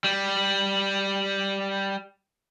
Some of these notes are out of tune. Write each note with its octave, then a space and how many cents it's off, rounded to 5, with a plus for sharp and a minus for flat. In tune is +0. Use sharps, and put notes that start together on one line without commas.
G3 +0